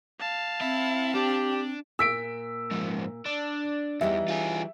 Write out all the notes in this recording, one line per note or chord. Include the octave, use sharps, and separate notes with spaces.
F5 A5
C4 E4
D4 G4
A#2 E6 B6 D7
G#2 F3
D4
E2 E3 G3 D#4 E5
F4 G#4